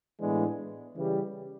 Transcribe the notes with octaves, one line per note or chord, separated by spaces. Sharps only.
A2 E3 G#3 B3 D4
C#3 E3 G3